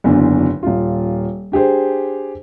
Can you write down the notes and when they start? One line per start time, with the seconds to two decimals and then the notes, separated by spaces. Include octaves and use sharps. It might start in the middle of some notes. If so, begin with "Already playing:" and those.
0.04 F#1 E2 D3 D4
0.63 D#1 F4
1.52 D4 G4 G#4 C5